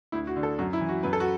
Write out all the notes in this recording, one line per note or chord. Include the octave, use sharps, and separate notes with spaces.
D2 E4
F#4
D3
A4
F#2 F#4
E4
E3
F#4
F#2 B4
A4
F#4